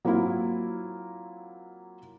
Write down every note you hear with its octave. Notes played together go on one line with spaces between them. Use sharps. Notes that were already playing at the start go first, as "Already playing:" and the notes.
F#3 A#3 C4 E4 F4